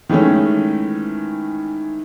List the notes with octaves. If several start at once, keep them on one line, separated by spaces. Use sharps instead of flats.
D#3 E3 G#3 A3 C#4